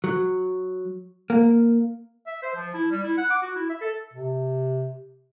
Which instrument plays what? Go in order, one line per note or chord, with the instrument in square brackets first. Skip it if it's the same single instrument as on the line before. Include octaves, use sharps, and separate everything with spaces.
[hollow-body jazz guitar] F#3
A#3
[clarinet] E5
C5
F3
E4
G3
E4
F#5
D6
F#4
E4
E5
A4
[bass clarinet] C3